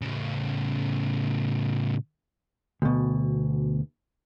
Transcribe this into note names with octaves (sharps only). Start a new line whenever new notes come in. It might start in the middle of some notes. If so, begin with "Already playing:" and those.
A2 C#3
D2 B2